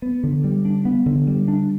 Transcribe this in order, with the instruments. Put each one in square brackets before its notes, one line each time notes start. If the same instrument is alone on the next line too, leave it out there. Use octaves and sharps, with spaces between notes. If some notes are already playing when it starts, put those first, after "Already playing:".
[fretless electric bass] B3
D3
G3
D4
B3
D3
G3
D4